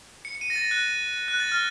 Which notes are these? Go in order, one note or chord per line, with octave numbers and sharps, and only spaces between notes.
C#7
C#7
D#7
A#6
A6
F#6
F#6
A6
F6